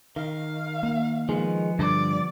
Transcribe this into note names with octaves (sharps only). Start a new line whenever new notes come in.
D#3 F5
A#3
D#3 F3 G#3 B3
G2 D3 D5